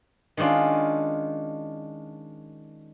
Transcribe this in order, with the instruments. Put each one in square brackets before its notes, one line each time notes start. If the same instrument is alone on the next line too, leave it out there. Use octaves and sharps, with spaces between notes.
[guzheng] D#3 G#3 C#4 D4 F4